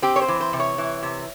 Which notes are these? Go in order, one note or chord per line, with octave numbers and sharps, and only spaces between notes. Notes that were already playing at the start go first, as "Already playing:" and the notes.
C4 G4
C#5
C5
E3
C5
C3
C#5
E3
C3